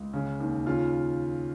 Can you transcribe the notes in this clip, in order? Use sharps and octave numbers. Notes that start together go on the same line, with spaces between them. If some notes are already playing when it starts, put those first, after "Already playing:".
Already playing: C#2
C#3
D#2
C#3 F4